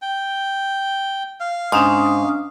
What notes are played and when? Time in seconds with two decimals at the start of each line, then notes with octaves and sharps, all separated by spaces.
0.02 G5
1.40 F5
1.72 G#2 C#4 D4 D#6